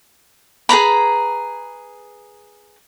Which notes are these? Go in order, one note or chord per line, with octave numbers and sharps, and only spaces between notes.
G#4 B4 A#5 B5